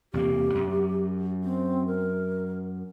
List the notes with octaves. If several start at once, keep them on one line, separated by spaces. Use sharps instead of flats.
E2 C3 A#3 G4
F#2
C4
A#4